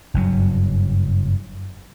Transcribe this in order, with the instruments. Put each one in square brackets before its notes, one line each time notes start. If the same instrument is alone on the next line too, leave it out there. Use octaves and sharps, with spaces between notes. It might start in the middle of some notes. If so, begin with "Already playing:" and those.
[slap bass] F#1 G2 F#3